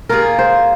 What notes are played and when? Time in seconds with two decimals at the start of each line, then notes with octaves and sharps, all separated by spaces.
0.09 D#3 A#3 F4 G#4 A#4
0.39 C5